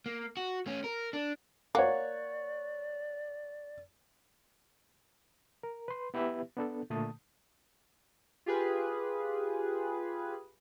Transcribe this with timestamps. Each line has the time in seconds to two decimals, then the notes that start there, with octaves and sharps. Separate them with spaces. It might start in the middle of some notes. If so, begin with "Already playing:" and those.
0.06 A#3
0.37 F#4
0.66 A3 C#4
0.84 A#4
1.13 D4
1.75 A#3 C#5 D5 F#5
5.63 A#4
5.88 B4 C6
6.14 B3 E4 G4 B4 E5
6.57 B3 D4 A4
6.90 A#2 D3 A3 A5 D#6
8.46 F4 G4 G#4 B4